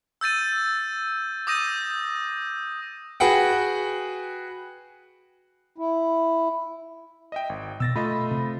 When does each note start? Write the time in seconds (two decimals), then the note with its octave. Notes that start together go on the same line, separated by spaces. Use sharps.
0.21 E6 G6 A6 D#7
1.47 D6 D#6 G6 A#6 D#7
3.20 F#4 G#4 B4 F#5 G5
5.78 E4
7.32 D#5 E5 G5
7.49 G#1
7.80 B2 E6 A6 A#6
7.96 A3 F4 D#5 B5
8.31 C3